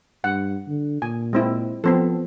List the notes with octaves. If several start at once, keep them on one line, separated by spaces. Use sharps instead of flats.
G2 F#5
D3
A#2 G#5
G#3 C4 E4
F3 B3 C4 A4